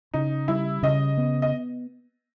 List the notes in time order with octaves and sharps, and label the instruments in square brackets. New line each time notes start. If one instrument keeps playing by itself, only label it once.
[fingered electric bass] C#3 [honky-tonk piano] D#4
[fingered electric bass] G3 [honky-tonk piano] E4
[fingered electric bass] C#3 [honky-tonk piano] D#5
[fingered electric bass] B3
[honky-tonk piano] D#5